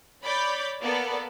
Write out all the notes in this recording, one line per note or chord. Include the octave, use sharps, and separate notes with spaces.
C#5 D5 B5 D6 G6
A#3 B3 A4 D5